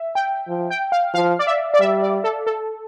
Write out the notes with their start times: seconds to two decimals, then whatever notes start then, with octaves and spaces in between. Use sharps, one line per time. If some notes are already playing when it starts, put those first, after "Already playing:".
Already playing: E5
0.15 G5
0.48 F3
0.70 G5
0.92 F5
1.14 F3 F5
1.39 D5
1.47 E5
1.74 D5
1.80 G3 E5
2.03 D5
2.24 A4
2.47 A4